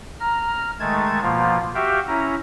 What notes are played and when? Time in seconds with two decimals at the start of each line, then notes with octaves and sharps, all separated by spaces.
0.20 A#5 F6
0.80 D#3 G#3 A3 A5 G#6
1.22 B2 F3 A#3 F4
1.75 F#4 G4 E5 F5 G5
2.08 C#4 E4 A#5